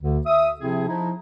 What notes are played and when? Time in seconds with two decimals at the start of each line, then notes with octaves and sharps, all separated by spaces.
0.02 D2 D3
0.26 E5 D#6
0.60 C3 F3 C4 E4 G#4
0.88 F3 D#4 E4